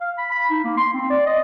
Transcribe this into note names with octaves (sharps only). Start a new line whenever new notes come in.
F5
B5
B5
D#4
A#3
C6
C4
D5
D#5